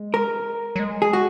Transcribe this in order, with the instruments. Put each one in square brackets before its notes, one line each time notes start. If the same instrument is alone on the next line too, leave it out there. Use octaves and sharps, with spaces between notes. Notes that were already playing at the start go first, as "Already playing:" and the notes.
Already playing: [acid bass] G#3
[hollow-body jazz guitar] A#4
[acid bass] F#3
G#3
[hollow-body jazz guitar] G#4
F#4